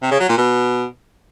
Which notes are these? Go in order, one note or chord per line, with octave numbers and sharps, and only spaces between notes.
C3
C#3
F#3
A#2
B2